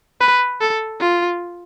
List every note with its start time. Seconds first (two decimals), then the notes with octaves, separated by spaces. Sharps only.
0.20 B4
0.61 A4
1.01 F4